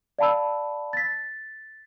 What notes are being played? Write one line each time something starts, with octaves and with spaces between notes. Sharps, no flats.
D5 F5 A5 B5 E6
A6 B6